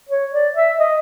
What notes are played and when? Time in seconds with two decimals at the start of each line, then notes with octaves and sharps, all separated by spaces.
0.09 C#5
0.33 D5
0.56 E5
0.79 D#5